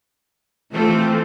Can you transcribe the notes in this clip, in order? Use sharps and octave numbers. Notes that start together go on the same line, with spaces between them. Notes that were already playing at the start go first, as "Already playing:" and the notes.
E3 A3 C4 F4 A4